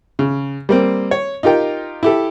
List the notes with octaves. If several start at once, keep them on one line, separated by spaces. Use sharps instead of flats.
C#3
G3 A#3 C4
C#5
D#4 F4 G4 A#4 G5
E4 G4 A4